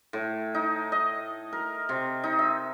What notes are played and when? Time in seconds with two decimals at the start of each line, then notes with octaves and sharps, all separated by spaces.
0.13 A2
0.54 D#4
0.92 D#5
1.53 A#4
1.89 C3
2.24 D#4
2.39 E5